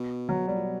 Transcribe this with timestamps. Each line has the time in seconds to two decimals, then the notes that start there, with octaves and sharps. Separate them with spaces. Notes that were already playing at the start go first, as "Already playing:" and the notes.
Already playing: B2
0.29 F#3
0.47 B2 G3
0.55 A#2
0.64 B2